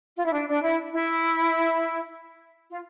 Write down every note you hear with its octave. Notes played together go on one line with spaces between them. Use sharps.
F4
E4
D4
D4
E4
E4
F4